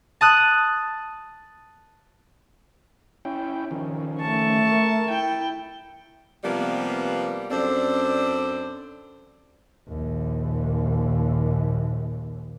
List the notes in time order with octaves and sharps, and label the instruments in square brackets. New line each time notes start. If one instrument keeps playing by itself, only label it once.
[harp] A5 D#6 F#6
[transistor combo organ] C#4 E4 G5
D#3 F3 C#4
[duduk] A3 [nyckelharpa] A5 C#6
[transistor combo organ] A#4
[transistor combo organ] E4 [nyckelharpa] G5
[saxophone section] C3 F3 G3 A#3 B3
F#2 C4 D4 A4 C5 D5
[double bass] A#1 D#2